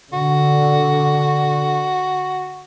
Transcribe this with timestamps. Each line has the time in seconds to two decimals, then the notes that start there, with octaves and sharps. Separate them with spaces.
0.13 D3 F#4